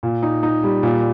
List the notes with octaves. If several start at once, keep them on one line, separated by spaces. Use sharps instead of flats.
A#2
D#4
D#4
G3
A#2